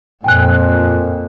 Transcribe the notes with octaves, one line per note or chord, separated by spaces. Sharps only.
F2 A#2 G5 G#5 F#6